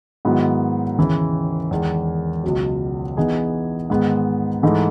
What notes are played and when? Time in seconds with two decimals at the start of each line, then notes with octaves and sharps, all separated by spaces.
0.25 G#2 D#3 F#3 B3 E4
0.98 D#2 C#3 E3
1.71 E2 D#3 G#3
2.44 C#2 B2 F#3
3.17 E3 B3 D#4 G#4
3.90 G#2 D#3 G#3 B3
4.63 G#2 E3 A3 D#4